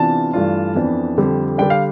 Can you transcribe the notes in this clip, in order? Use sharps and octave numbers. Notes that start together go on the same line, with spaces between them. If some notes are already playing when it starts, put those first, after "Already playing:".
Already playing: C3 E3 B3 D4 F4 A5
G2 E3 A3 D4 F4
F2 E3 B3 D4
F2 D3 G3
D3 G3 D4 G5
F5